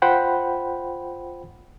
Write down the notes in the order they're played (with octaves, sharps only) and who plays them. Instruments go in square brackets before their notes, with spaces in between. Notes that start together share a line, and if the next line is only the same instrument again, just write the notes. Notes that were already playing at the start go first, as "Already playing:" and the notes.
[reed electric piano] F4 C5 F#5 G5 B5